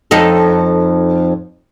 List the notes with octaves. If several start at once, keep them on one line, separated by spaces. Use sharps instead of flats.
F2 D#4 A4